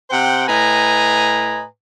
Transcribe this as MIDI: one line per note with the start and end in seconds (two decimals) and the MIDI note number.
0.10 0.47 48
0.10 0.47 72
0.10 0.47 78
0.10 0.47 79
0.48 1.65 45
0.48 1.65 71
0.48 1.65 75
0.48 1.65 80
0.48 1.65 82